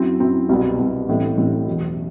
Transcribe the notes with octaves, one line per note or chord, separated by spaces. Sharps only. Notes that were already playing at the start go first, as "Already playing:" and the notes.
Already playing: F#2 F#3 C4 E4
F#2 F#3 C4 E4
C2 B2 G3 C4
C2 B2 G3 C4
A1 A2 G3 C4
A1 A2 G3 C4
E2 B2 F#3